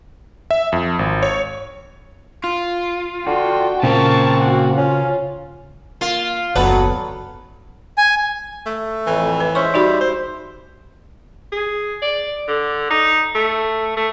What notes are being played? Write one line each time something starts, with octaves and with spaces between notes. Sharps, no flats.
E5
F2
G#1
C#5
F4
D3 F#4 G5
A#2 C#3 A#3 C4 A#4 A5 C#6
F#4 F#5
C#4 F4
A#3 F4
F#1 D#2 F#3 B3 A4 B4 D5
G#5
A3
F2 A2 E3
B4
G#3 C#4 C5 E5 C#6
G3 D#4 F#4 B5
C5
G#4
D5
D3
D#4
A3
A3